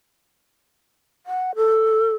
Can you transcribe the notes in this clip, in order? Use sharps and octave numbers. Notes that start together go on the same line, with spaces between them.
F#5
A4